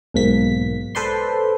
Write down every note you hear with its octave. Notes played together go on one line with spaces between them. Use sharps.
B1 G#2 A#3 B6
A4 B4 C5 D5 C6